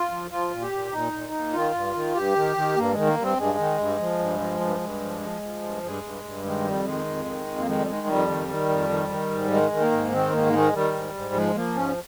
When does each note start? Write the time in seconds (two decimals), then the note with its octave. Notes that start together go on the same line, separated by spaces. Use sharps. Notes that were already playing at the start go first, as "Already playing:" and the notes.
Already playing: F4
0.11 F3
0.30 F3 F4
0.51 A#2
0.62 G4
0.72 A#2
0.92 A#2 D#4
1.13 A#2
1.33 A#2
1.53 D#3 F4
1.74 G2
1.95 D#3
2.15 G2 G4
2.36 D#3
2.56 D#3
2.76 G2 A#3
2.92 D#3 G#3
3.07 A#3
3.16 G2
3.22 C4
3.37 G2 G#3
3.58 D#3
3.78 G2
3.99 F3
4.19 G2
4.40 F3
4.60 G2
4.81 G2
5.01 F3
5.21 F3
5.42 F3
5.62 G2
5.83 G2 G#3
6.03 G2
6.24 G2
6.44 D#3 G#3
6.64 F2 G3
6.85 D#3 G#3
7.06 F2
7.25 D#3
7.46 F2
7.59 A#3
7.66 D#3 G#3
7.79 G3
7.87 D#3 G#3
8.07 F2 G3
8.29 D#3
8.48 D#3
8.69 F2
8.90 D#3
9.09 D#3
9.31 G#2
9.50 D#3 G#3
9.71 D#3
9.81 A#3
9.91 G#2
10.12 D#3 C4
10.33 G#2 A#3
10.53 D#3 G#3
10.73 D#3 G3
10.94 G#2
11.14 G#2
11.34 F3 G#3
11.55 F3 A#3
11.75 G#2 C#4